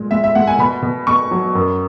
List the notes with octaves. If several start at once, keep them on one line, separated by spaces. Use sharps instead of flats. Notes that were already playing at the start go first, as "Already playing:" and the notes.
Already playing: A#2 G#3
G#3 E5
E5
G#3 F#5
G#5
B2 B5
B2
B2 C#6
F#3
F#2